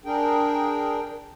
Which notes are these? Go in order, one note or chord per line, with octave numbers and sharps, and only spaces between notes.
D4 G#4 A#4 G5